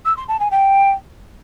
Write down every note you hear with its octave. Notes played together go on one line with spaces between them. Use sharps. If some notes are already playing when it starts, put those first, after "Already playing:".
E6
C6
A5
G#5
G5